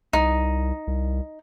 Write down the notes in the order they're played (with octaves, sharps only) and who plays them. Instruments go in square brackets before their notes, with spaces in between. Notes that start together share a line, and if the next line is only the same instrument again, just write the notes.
[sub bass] C2 [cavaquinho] D#4
[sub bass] C2